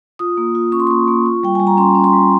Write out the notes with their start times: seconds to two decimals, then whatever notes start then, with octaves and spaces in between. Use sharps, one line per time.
0.19 F4 D#6
0.37 A#3
0.55 F4
0.72 C#4 C#6
0.80 C6
0.87 A#3 C#6
1.08 A#3
1.26 F4
1.43 G3 G5
1.55 G3 G#5
1.67 A#5
1.77 C#4 C6
1.95 C#4
2.04 C6
2.13 G3